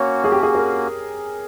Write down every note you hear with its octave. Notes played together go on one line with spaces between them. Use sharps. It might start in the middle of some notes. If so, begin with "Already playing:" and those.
Already playing: A#3 C#4 F#4 C#5
G#4
G4
G#4
A#4